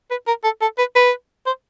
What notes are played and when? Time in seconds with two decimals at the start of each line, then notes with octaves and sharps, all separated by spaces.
0.11 B4
0.27 A#4
0.44 A4
0.62 A4
0.78 B4
0.95 B4
1.46 C5